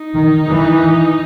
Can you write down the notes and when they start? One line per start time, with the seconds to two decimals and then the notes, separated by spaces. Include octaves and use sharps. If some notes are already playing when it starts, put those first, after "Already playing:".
Already playing: D#4
0.15 D#3
0.47 E3